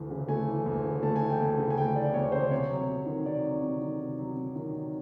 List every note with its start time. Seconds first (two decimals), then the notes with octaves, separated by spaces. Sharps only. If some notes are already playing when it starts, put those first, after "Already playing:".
Already playing: D2 E3 A3
0.11 C#3
0.29 A3 G#5
0.48 E3
0.66 D2
0.84 C#3
1.03 A3 A5
1.16 G#5
1.21 E3
1.30 G5
1.40 D2 G#5
1.58 C#3
1.70 G#5
1.77 A3 G5
1.96 E3 D5
2.14 D2 C#5
2.32 C#3 C5
2.51 C3 C#5
2.70 F#3
2.89 C3
3.06 D#3
3.25 C3 D5
3.44 F#3
3.62 C3
3.82 D#3
3.99 C3
4.19 F#3
4.36 C3
4.56 D#3
4.73 C3